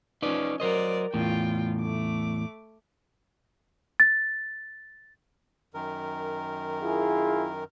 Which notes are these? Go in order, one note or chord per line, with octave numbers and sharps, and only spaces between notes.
F3 C#4 D#4 B4 D5
F#3 A#4 C5 D5 D#5
E2 A2 F4 G5
A3 D6
A6
F#2 D#3 A#4
E4 F4 G#4